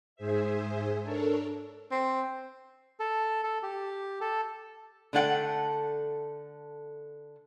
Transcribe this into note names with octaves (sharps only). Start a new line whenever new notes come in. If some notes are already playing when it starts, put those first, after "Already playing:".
G#2 G#4 C5 E5
D4 A4 A#4 C#5
C4
A4
A4
G4
A4
D3 A3 A4 F#5 G5